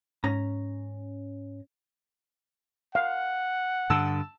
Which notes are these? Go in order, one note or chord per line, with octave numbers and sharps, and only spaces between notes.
G#2 C#4 A#5
F5 F#5
G2 D3 A5 E6